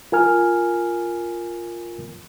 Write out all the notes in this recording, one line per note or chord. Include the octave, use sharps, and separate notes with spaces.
F4 A#4 G#5 F6